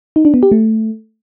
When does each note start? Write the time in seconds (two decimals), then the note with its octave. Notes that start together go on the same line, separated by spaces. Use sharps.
0.16 D#4
0.25 D4
0.34 B3
0.43 G4
0.52 A3